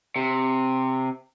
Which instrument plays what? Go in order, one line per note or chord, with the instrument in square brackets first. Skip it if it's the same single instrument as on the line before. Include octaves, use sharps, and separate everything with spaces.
[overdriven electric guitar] C3